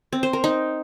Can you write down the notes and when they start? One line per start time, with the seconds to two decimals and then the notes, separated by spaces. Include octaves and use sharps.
0.12 C4
0.23 C5
0.33 A#4
0.44 D#4